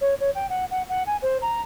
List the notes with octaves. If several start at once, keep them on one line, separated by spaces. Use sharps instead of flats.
C#5
C#5
G5
F#5
F#5
F#5
G#5
C5
A#5